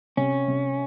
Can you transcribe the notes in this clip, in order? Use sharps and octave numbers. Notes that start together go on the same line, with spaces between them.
C3 C#4
C3